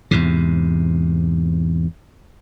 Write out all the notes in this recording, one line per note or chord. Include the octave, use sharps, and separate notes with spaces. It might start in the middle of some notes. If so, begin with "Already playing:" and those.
E2 G#2 C3